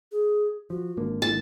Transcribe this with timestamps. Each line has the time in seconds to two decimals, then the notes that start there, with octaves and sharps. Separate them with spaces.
0.12 G#4
0.70 F3 F#4
0.97 G#1 D3 A#3
1.22 E4 A5